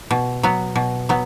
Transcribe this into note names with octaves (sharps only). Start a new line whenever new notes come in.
B2
F#3 B3
B2
F#3 B3